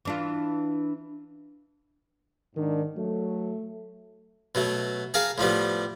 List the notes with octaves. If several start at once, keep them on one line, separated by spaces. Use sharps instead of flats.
E3 D4 F4
G#2 D#3 D4
F#3 A3
B2 F#3 A3
G#4 A#4 F5 A5
A2 F3 G3 B3